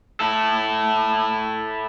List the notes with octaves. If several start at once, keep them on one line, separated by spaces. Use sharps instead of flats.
E4 A4